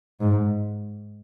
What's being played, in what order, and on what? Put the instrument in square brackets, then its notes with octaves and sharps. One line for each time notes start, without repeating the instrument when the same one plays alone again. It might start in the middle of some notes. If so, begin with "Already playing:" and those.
[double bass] G#2